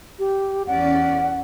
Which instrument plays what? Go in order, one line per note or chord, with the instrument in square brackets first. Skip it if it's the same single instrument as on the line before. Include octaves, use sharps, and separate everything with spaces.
[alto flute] G4
[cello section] E2 C#4 D5 [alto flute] F#5